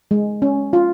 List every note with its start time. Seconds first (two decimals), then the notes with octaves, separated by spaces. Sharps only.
0.11 G#3
0.42 C#4
0.73 F4